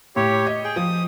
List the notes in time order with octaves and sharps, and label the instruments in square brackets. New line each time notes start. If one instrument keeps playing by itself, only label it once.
[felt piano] A2 [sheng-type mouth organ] G4 C#5
[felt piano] D#5
[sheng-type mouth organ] G#4 G5
[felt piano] F3 [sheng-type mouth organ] D#6